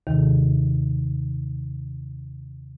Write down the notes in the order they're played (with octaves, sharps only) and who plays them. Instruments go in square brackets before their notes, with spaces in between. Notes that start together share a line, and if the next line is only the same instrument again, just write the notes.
[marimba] D#2 C3 D#3